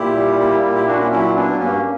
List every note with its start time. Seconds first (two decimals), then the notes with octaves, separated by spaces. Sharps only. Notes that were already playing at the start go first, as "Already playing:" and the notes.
Already playing: A#2 E4 G4
0.15 G3
0.39 A#3
0.63 A#2
0.75 E4 G4
0.87 A#2 D4 F#4
0.99 C#4 E4
1.11 F#3 C#4 E4
1.35 A#3 B3 D4
1.59 G2 A#3 C#4